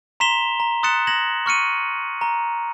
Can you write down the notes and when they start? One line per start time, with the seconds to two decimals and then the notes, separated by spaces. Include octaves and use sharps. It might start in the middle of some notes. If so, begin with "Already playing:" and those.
0.20 A#5 C6 B6 E7 F7 G7
0.60 A#5
0.83 C6 D#6 F#6 A6 C#7 E7
1.07 G#6 A#6 E7 F#7
1.46 C#6 F6 C#7 D#7
2.21 A#5